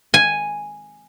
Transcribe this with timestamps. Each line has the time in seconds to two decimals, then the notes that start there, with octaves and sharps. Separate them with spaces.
0.14 G#5